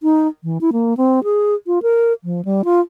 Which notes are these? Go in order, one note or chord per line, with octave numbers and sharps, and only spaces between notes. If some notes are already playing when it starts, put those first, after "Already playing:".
D#4
E3
E4
A#3
C4
G#4
F4
A#4
F3
G3
F4